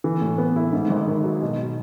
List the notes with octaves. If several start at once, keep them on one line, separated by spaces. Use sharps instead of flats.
E3
A2
B3
E4
G#2
G#1
D#3
F#3
B2